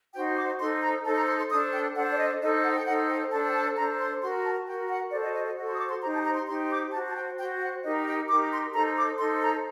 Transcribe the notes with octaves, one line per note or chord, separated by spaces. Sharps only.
D#4 F#4 C5 G5
D6
D#4 A4 C5 C6
A#5
D#4 A4 C5 A5
A#5
C6
C6
D4 A4 C5 D#6
G5
D4 A4 C5 F#5
D5
D#5
D#4 A4 C5 D#5
F#5
G5
D#4 A4 C5 F#5
G5
D4 A4 C5 A5
G5
A5
D4 A4 C5 A#5
C6
F#4 A#4 C6
A5
F#4 A#4 G5
F#5
F#4 A4 C5 D5
D#5
D#5
D#5
F#4 A4 C5 D#5
C6
D#6
D6
C6
D#4 G4 C5 A#5
A5
A#5
C6
D#4 G4 C5 C6
D6
F#4 C5 A5
A5
G5
F#4 C5 G5
G5
F#5
D#4 G4 A#4 D#5
G5
D#4 G4 A#4 D6
C6
D#4 A4 C5 A#5
D6
D#4 A4 C5 C6
A#5